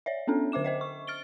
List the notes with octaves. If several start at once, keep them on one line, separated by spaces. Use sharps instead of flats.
C#5 D5 E5
B3 C#4 D4 A4
D3 C5 E5 D6 E7
C5 D#5 E5
C#6
F6 A6 D7 G7